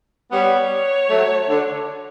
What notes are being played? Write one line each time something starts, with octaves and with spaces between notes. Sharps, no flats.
G3 B3 C#5
F#3 A3
D3